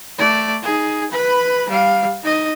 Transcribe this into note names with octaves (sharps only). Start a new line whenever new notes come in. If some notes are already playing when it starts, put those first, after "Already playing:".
A3 D5
D#4 G#4
B4 B5
G3 F5
D#4 D#5